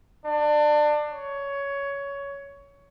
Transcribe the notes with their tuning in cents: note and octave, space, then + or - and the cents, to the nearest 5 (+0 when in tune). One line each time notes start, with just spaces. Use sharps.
D4 +25
C#5 +15